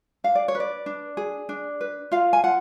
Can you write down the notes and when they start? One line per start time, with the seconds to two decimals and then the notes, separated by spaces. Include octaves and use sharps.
0.24 D4 F5
0.35 D5
0.48 C#5
0.55 B4
0.60 D5
0.86 D4
1.17 G#4
1.49 D4
1.81 B4
2.12 F4 F5
2.33 G#5
2.44 F4 F#5